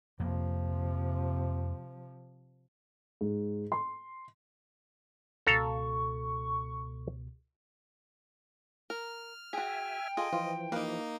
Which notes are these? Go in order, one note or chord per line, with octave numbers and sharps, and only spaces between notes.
F2 C3 F3 A#3
G#2
C6
C#2 B2 A4 F5 A#5 C#6
A#4 F6
F#4 G#4 E5 G5 G#5
F4 G#4 A4 D#5
E3 F3 F4
A#3 D#4 G4 B4 F5